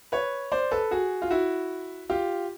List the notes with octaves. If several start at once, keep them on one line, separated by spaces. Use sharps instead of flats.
B4 C#5
C5 D5
A4 B4
F#4 G#4
F4
E4 F#4
F4 G4